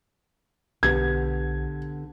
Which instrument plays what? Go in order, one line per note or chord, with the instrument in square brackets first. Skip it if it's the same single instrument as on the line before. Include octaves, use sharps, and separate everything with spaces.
[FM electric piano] B1 [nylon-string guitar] D3 B3 G4 [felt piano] G#6